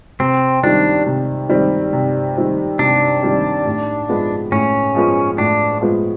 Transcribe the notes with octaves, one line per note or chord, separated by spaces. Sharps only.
C3 C4
D#3 G3 C4 D4
C3
D#3 G3 C4
C3
D#3 G3 C4
C3 D4
D#3 G3 C4
A2
F3 G#3 B3
A2 C#4
F3 G#3 B3
A2 D4
F3 G#3 B3